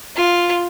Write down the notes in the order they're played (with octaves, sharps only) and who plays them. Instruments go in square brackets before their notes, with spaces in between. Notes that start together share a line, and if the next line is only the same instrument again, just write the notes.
[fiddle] F4